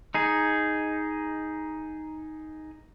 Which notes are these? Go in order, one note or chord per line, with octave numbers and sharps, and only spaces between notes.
D#4 G#4